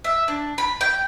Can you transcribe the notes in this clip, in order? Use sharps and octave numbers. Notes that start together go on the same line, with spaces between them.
E5
D4
B5
G5